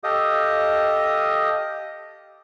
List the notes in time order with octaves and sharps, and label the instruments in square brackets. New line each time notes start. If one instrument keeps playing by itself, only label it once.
[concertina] G4 A4 D#5 F5 D#6